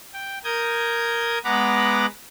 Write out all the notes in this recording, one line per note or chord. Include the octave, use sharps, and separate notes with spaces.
G5
A#4 D#6 G6 G#6
G#3 B3 F#5 A#5 B5 D6